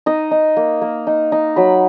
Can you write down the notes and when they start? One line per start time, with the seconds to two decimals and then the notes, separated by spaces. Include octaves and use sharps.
0.06 D#4 D#5
0.31 D#4
0.57 A#3
0.82 A#3
1.07 D#4
1.32 D#4
1.56 F#3 B5